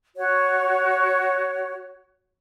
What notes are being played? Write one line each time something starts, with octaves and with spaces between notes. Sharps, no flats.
F#4 C#5